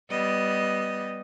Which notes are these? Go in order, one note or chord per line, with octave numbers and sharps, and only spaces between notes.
G3 B3 D#5